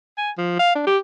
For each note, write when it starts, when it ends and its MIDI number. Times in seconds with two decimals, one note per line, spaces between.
0.18 0.31 80
0.38 0.56 53
0.59 0.73 77
0.75 0.85 62
0.87 0.98 67